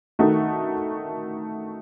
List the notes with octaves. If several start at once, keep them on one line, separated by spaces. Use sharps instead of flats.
D#3 A3 D#4 F#4